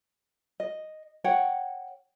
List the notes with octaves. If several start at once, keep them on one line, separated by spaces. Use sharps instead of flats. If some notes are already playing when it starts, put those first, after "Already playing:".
D#5
C#5 F#5 G5